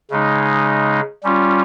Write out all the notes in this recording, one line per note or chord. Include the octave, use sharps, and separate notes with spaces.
C#3 G#3 D#4
G3 C#4 F4